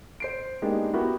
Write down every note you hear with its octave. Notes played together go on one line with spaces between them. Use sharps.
C5 C7 D7
G#3 A#3 B3 D4 D#4 G4
B3 E4 F#4 G4 A#4